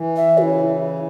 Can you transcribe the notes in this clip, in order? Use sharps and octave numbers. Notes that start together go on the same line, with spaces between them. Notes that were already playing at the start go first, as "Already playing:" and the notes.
Already playing: E3
E5
C#3 E4 F#4